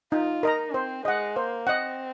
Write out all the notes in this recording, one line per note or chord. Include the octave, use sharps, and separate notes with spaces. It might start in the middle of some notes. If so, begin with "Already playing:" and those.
D#4 F4
D#4 A#4 D#5 A#5
C4 C5
G#3 D#5 F#5
A#3 C5
C4 D#5 F#5